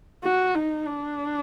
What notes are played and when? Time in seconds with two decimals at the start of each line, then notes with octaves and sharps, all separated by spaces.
0.23 F#4
0.55 D#4
0.86 D4